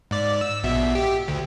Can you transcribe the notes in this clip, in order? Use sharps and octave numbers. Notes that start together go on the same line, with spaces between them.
G#2 D5
E6
A#1 B2 E5
G4
D2